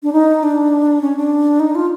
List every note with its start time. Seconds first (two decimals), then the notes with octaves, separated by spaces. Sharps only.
0.03 D4
0.13 D#4
0.43 D4
1.01 C#4
1.17 D4
1.60 D#4
1.75 F4